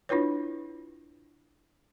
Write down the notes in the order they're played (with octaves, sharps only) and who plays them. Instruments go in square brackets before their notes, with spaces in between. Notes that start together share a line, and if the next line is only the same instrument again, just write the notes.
[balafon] D4 E4 F4 B4 C#5